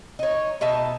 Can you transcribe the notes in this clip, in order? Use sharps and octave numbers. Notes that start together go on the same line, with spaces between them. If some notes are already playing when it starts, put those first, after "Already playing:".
D#4 C#5
B2 D#4 E5 A5